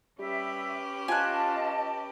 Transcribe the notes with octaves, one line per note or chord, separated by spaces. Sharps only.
G3 C#4 G4 B4 E5
F4 D#5 G#5 A5 F#6